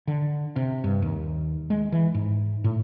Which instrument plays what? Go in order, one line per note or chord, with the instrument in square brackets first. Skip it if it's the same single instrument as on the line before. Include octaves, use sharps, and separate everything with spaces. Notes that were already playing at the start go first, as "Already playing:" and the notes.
[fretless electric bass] D3
C3
G2
D#2
G#3
E3
G#2
A2